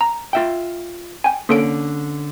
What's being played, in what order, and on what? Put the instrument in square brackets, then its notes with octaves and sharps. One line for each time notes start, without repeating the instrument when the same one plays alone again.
[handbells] A#5
[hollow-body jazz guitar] F4 E5 G5
[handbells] G5 G#5
[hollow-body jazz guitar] D3 C#4 [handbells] A#3 A4 D7